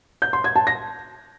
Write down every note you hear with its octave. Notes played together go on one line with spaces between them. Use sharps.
G6
C6
G#6
A5
A#6